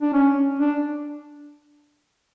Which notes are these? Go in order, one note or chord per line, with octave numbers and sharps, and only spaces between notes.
D4
C#4
D4